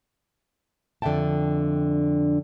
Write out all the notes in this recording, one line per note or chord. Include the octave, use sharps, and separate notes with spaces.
F2 D3 D4 E5 G5 A5